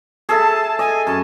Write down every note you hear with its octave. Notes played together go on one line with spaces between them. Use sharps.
G#4 A4 E5 A5
D#5 G#5
F#2 A5